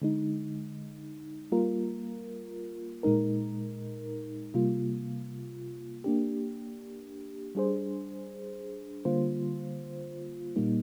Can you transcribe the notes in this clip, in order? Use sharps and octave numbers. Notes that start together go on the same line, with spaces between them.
D3 G#3 D#4
G3 A#3 F4 A#4
A#2 G#3 D#4 A#4
C3 G3 A#3 F4
A#3 D4 G4
G3 D4 G#4 C5
D3 G3 A#3 F4 C5
A#2 G3 A#3 D#4